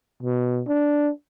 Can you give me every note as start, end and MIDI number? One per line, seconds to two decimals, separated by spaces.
0.23 0.61 47
0.68 1.10 62